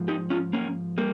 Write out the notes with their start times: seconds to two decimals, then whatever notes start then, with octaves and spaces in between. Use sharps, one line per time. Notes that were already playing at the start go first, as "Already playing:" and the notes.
Already playing: G#2 F3
0.08 D#4 G4
0.30 C#4 F4
0.53 A#3 C#4
0.98 G3 A#3